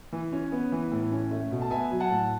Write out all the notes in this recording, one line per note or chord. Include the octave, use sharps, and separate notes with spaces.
E3
C#4
B3
E3
A2
C#4
A3
B2
A5
B3 E5 G#5
F#3
F#5 A5
A2